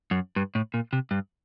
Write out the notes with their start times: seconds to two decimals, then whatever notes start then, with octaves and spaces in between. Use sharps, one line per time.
0.11 F#2
0.36 G2
0.55 A2
0.74 A#2
0.93 C3
1.11 G2